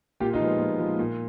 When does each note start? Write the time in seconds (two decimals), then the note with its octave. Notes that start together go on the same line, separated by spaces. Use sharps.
0.20 A#2 F4 G4
0.34 D#4 F4
0.40 F3 G#3 B3
0.60 A#2
0.79 F3 G#3 B3
0.99 A#2